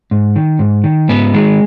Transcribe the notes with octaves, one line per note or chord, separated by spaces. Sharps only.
G#2
D#3
G#2
D#3
G#2 B3
D#3 G#3